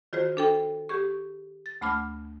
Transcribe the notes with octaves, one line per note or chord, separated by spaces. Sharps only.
D#3 F4 F#4 G#4 C5
D4 A4 G5
G4 G#4 C#6
A6
D2 A3 B5 D6 F6